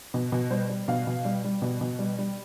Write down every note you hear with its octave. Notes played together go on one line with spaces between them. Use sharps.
B2
B2
G3 C5
G3
B2 F5
B2
G3
G3
B2
B2
G3
G3